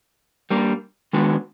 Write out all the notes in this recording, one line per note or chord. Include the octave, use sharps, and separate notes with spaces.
G3 A#3 D4
D#3 G#3 B3 D4 F#4